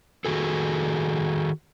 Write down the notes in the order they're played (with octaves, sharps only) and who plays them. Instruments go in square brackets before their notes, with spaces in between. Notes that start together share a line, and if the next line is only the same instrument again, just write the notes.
[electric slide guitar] D#3 F#4 G#4 A4